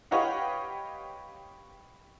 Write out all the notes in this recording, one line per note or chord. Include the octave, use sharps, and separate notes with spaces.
G4 B4 C#5 D#5 F5 F#5